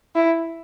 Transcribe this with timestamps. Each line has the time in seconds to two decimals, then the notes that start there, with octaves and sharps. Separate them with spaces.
0.15 E4